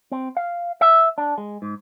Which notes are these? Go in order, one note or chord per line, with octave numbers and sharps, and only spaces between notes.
C4
F5
E5
D4
G#3
G#2